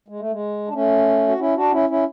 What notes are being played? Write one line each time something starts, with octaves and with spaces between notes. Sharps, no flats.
G#3
A3
G#3
D4
A3 C#4
F#4
C#4 E4
D4 F#4
C#4 E4
C#4 E4